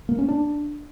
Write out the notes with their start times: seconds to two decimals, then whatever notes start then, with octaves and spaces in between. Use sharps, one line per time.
0.09 A#3
0.19 C#4
0.28 D4